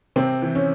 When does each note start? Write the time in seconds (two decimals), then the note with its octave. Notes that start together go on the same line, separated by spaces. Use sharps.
0.16 C3 C4
0.42 E3
0.55 C#4